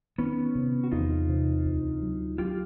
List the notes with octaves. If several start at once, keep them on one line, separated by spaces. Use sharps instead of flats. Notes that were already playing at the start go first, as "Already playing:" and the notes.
D#3 B3 C#4
C3
F#4
E2 D#4 F4
C3
D2
F#3
F#3 F4 G4